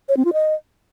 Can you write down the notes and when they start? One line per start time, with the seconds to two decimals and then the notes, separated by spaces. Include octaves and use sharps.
0.09 C#5
0.17 C4
0.25 F4
0.33 D#5